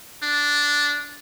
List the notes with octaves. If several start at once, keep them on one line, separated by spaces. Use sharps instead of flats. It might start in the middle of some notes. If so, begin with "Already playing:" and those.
D4